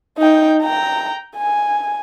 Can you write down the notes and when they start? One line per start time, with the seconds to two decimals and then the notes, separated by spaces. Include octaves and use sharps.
0.18 D#4 G5
0.62 G5 A#5
1.37 G#5